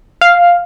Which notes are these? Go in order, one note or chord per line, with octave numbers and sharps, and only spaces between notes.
F5